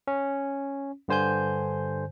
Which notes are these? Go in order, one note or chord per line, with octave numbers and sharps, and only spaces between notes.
C#4
G2 D3 C5 G#5 G6